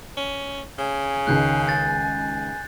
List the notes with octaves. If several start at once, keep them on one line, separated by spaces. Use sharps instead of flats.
C#4
C#3 G#5
C#2 D#3 G#3 F#6 G6 C7
G6 A6